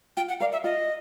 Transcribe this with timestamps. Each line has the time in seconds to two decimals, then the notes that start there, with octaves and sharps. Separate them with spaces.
0.17 F4 G5
0.29 F#5
0.40 A#4 D5 F5
0.53 E5
0.64 F4 D#5